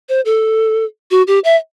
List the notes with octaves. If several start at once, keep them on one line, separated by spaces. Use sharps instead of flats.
C5
A4
F#4
G4
E5